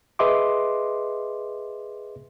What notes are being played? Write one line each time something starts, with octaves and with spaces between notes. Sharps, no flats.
G#4 B4 D#5 E5 C6 D6